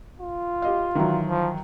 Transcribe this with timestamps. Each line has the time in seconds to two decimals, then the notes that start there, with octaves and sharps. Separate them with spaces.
0.20 F4
0.62 G4 D#5 F5
0.95 D#3 E3 F#3
1.26 F3